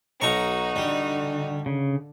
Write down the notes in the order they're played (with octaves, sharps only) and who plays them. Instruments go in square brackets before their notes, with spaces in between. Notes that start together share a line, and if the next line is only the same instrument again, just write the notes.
[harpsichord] B1 A#5 C#6 [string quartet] D#4 F#4
[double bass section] D3 [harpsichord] G3
[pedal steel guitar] C#3